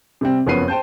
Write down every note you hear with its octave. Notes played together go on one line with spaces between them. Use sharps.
C3 G3 C4
F#1 F2 B3 C#4 C7 D#7
C5 G5 A5 G6